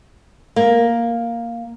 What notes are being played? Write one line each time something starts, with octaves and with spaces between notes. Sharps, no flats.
A#3